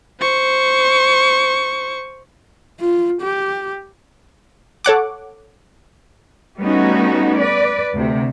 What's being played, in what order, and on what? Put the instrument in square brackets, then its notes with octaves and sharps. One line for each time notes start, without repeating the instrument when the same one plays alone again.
[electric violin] C5 C#6
[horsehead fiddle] F4
G4
[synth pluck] A4 C#5 F#5 D6
[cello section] G3 A3 B3 C#4 D#4 F#4
B4 D5
D2 C3